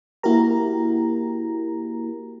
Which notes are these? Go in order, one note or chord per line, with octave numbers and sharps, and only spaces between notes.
A#3 E4 F#4 G4 A#4 A#5